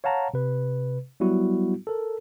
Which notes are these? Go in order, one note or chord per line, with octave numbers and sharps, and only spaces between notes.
C#5 F5 F#5 A5 A#5
C3 B4
F#3 G3 B3 E4 F#4
A4 A#4